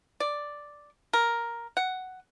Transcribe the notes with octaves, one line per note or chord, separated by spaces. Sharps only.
D5
A#4
F#5